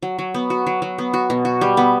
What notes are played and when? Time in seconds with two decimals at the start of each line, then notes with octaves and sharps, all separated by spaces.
0.02 F#3
0.19 F#3
0.34 B3
0.50 F#4
0.67 F#3
0.82 F#3
0.98 B3
1.14 F#4
1.30 B2
1.45 F#4
1.61 G3
1.77 B3